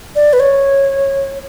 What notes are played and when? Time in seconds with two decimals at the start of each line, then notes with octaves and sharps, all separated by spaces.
0.16 D5
0.33 B4
0.40 C#5